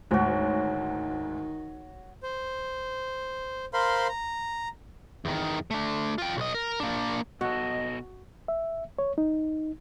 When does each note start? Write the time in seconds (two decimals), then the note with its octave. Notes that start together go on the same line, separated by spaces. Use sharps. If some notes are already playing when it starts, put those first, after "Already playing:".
0.11 D2 G#2 D#3 F#4 C#5
2.23 C5
3.74 A#4 C5 F5 B5 C6
4.08 A#5
5.25 E2 D#3
5.71 A3 D4
6.18 F4 G5
6.37 B1 D#5
6.55 A#4
6.80 A#3 D4
7.41 B2 F#4 A4 D#5
8.48 E5
8.99 C#5
9.18 D#4